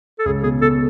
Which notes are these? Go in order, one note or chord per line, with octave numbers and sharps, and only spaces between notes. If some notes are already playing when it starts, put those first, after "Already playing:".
A4
C#2 G#4
B2 G#4
B2 A4